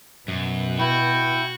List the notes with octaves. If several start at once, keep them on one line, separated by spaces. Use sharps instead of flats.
F#2 B2
E4 F#4 G5